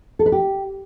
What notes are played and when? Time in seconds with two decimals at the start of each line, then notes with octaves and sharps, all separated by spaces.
0.19 A4
0.26 B4
0.32 G4